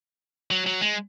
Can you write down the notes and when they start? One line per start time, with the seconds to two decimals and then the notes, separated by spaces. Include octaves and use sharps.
0.51 F#3
0.66 F#3
0.81 G#3